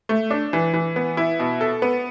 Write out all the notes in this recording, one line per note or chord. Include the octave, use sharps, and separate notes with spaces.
A3
D4
E3
E3
B3
E4
B2
A4
B3